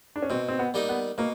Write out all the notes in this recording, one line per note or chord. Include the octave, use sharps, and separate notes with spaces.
D4
C#4
B2 C4
C4
B3
G3 A#3 D#4
B3
B2 A#3